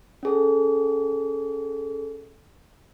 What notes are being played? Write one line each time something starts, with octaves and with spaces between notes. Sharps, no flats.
C#4 G#4 A4